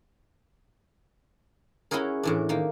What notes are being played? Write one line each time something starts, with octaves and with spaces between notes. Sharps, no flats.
C#4 E4 F#4 G#4 A#4
A2 E3 D4
D#3 A#3